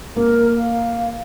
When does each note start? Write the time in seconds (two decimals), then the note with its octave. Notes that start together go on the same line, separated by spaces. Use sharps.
0.16 A#3 A#4
0.58 F5